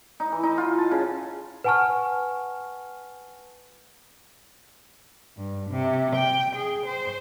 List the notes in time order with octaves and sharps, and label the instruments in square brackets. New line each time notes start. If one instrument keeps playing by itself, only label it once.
[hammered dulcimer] D#4
E3
D#4
F4
A5
C#3
[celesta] B4 F#5 G#5 A5 C#6 F6
[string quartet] G2
C3
G5
G#4
C5